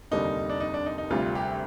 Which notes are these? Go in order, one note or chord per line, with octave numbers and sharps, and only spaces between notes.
F1 D#2 D3 G3 D4 D#4
D4
D#4
D4
D#4
D#4
D2 C3 G3 F4
G4